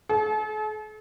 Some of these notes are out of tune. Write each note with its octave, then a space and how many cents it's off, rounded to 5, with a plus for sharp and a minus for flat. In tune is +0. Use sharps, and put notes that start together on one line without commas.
A4 -45